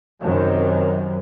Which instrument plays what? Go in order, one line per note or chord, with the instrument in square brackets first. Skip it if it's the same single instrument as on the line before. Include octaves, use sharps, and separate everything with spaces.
[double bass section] F#2 C3 D#3